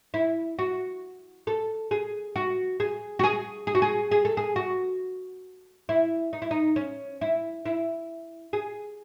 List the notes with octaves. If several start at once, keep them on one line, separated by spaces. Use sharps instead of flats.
E4
F#4
A4
G#4
F#4
G#4
F#4
G#4
G#4
F#4
G#4
G#4
A4
G#4
F#4
E4
D#4
E4
D#4
C#4
E4
E4
G#4